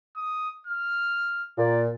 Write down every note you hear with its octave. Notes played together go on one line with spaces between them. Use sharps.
D#6
F6
A#2 D5